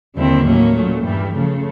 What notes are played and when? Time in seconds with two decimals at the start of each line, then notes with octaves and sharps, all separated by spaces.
0.15 D#2 D3 G3 C4 E4
0.44 A2 F#3 A#3 C#4
0.75 A#2 F#3 A3
1.03 G2 E3 G3
1.33 C#3 F3 A3